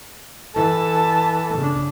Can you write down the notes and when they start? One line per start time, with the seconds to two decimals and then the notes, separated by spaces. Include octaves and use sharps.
0.56 E3 A4 A5
1.58 C#3 D4